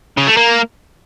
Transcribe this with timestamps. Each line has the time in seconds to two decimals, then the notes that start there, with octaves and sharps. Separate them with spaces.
0.18 C#3
0.27 A3
0.37 A#3